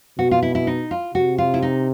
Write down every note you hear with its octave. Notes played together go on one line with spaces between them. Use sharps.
B2 F#4
F4
E4
E4
D#4
F4
C3 F#4
F4
E4
D#4